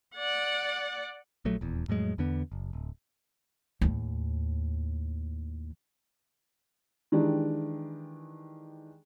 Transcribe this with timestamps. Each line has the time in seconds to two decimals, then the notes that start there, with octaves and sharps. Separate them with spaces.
0.16 D5 F#5
1.45 A#1 F#3 A3
1.61 D#1 E2
1.88 F2 A2 F#3 G#3
2.18 E2 D3 B3
2.52 F#1
2.73 D1
3.81 D#2 A2
7.12 D#3 E3 G#3 D4 G4